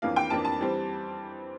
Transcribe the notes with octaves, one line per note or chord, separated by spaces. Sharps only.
F2 E3 A#3 D4 F5
G5
F2 E3 A#3 D4 A5
A5
E3 G3 C4